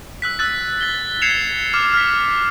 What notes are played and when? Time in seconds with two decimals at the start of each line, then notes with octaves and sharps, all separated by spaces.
0.22 E6 F#6 B6
0.39 E6 F#6 A6
0.81 A6 G7
1.21 G#6 C7 C#7 E7 F7 G7
1.73 D6 F6
1.94 F6 B6